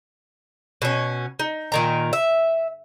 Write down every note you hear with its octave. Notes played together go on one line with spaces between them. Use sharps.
B2 C#4
D#4
A#2 D#3 A#5
E5